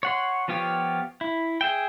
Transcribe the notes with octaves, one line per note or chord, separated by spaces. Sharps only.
C#5 F#5 C6
F3 B3 F4 G4 C#5
E4
G#4 E5 G5